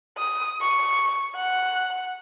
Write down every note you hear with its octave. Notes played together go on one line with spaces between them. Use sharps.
D#6
C#6
F#5